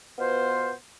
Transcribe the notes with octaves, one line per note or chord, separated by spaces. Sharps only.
B2 B3 F4 C5